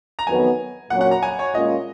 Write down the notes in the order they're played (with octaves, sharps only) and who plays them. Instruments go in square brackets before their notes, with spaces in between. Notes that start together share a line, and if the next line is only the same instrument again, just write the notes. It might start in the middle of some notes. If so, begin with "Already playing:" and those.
[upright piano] A#5
[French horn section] F2 D#3 F#3 B3 [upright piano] G#5
[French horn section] A#2 F#3 C#4 [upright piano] F#5
[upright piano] F#5
A#5
G#5
C#5
[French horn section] A#2 G#3 C#4 F4 [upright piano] D#5